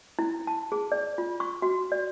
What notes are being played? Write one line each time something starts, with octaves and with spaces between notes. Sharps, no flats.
E4
A5
G#4
D5
F4
C#6
F#4
D5